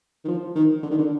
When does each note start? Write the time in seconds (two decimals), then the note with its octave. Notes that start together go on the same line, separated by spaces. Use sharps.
0.24 D#3
0.28 F3
0.55 D#3
0.83 D3
0.91 D#3
0.98 D3